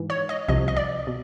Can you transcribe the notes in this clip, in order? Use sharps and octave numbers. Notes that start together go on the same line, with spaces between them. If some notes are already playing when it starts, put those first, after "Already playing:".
Already playing: G#2 E3
C#5
D#5
C2 C3 F3 D#5
D#5
D5
B2